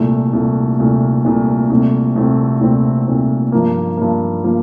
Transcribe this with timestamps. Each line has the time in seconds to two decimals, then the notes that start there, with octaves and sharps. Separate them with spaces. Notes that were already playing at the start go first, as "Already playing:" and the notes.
Already playing: C2 A#2 A3
0.33 C2 A#2 A3
0.79 C2 A#2 A3
1.25 C2 A#2 A3
1.70 C2 A#2 A3 C4
2.16 C2 A#2 A3 C4
2.61 C2 A#2 A3 C4
3.07 C2 A#2 A3 C4
3.52 G2 F3 A#3
3.97 G2 F3 A#3
4.44 F3 A#3